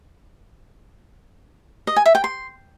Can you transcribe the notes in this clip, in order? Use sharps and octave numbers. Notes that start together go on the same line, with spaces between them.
D#5
G#5
E5
G5
C6